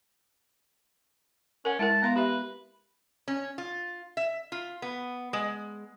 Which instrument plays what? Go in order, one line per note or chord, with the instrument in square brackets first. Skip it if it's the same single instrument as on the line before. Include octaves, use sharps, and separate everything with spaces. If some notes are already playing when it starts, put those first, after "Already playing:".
[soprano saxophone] C#4 [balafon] A#4 F#5
[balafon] G#3 E4 A#4 [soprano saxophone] A5
[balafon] B3 F5 C6 [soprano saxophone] A#5
[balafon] G4 E5 [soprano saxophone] B4
[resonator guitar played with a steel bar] C#4
F4
E5
F4
B3
G#3